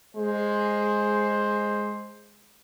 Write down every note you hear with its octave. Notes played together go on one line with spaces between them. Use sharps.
G#3 C5